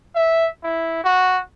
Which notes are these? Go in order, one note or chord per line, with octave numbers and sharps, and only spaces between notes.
E5
E4
F#4